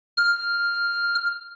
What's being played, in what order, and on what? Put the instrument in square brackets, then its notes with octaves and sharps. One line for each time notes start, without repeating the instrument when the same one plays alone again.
[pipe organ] F6